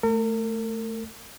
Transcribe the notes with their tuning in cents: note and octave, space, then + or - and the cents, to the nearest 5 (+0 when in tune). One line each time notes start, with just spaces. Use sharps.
A3 +0 A#4 -40